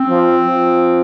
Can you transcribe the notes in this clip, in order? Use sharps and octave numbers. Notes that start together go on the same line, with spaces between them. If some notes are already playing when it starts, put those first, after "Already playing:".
Already playing: C4
F3
F3